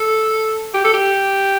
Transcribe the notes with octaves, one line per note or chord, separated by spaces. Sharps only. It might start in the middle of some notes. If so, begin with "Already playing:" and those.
Already playing: A4
G4
A4
G4